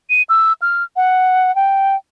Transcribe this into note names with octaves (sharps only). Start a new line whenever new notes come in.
D#7
E6
F6
F#5
G5